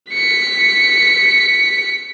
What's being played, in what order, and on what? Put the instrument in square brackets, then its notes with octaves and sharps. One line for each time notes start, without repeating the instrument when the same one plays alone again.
[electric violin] B6 C#7